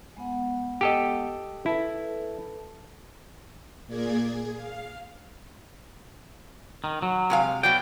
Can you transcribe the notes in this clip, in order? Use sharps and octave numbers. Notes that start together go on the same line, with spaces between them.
G#3 B3 F#5
G4 A4 D#5
E4 A4 B4 A5
A#2 A#3 G#4 D5 G#6
G#4
F5
D#3
F#3
C3 G#3 F5
B2 F#3 D5 G5